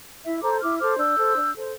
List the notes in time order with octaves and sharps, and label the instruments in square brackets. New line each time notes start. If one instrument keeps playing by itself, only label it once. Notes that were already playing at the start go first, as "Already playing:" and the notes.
[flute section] E4 E5
A4 C5 A#5 D6
G6
E4 D6 F6
A4 C5 D6 F6
D4 E6 G6
A4 C5
D4
A4 C5